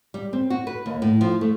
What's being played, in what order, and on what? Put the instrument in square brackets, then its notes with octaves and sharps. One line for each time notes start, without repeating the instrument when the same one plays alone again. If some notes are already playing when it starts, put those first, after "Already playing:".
[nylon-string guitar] G3
C4
F#4
B4
D#2
A2
F3
A3